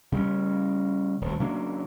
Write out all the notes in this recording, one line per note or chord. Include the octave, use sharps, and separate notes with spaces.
C#3 G3 C4 C#4
D#1 D2
C#3 F#3 A#3 D4